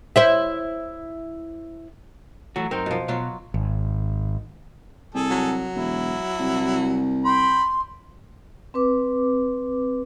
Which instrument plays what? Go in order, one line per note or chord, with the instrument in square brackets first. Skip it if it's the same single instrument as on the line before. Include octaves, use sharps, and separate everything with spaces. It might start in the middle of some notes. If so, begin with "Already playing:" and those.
[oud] E4 C5 E5
[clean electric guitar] E3 A3 F#4 [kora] F#3
[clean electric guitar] F#2 D#4 A#4 [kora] C4
[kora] B2 F3
[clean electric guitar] B2 [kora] F#3 F4 F#4
[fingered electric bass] G#1
[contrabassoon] C2 [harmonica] G#4 A4
[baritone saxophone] F#3
[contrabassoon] E1 [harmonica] E4
[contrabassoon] C2
[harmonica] G5 B5 [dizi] C6
[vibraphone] C4 B4 D6